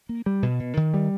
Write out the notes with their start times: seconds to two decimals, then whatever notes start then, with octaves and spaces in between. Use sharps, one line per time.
0.09 A#3
0.26 G3
0.43 B2
0.60 B2
0.77 D#3
0.94 G3